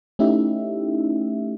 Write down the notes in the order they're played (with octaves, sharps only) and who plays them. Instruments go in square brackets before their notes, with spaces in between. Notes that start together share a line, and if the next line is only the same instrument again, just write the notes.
[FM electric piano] A3 C#4 D#4 E4 G4 E5